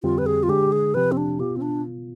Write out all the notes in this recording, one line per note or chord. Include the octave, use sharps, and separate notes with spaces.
F2 D3 G3 C4 F4 G4
B4
G#4
F4
D3 G#3 D4 G4 G#4
G#4
C3 F3 C4 G4 B4
C4
D4
B2 B3 F4 G4
C4
D4